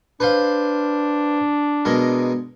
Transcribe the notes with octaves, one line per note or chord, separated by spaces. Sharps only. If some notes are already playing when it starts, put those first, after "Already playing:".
D4 B4 C5 F5
B2 G#3 A#4